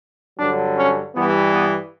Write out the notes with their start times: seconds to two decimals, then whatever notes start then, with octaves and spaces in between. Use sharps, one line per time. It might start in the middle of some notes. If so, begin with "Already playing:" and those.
0.37 G2 D3 F#3 D4
0.76 C#4
1.15 G2 E3 G3 B3
1.53 B3